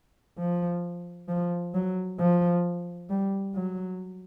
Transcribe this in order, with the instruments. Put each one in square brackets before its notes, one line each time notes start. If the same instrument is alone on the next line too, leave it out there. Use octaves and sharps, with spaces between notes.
[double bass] F3
F3
F#3
F3
G3
F#3